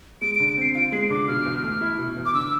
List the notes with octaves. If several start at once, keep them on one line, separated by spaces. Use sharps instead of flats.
G#3 D7
D7
D3
D7
C4 C7
F4 D7
G#3 C7
D3 D6
B2 F6
E2
A3
E4
B2
E2
D6
D3 E6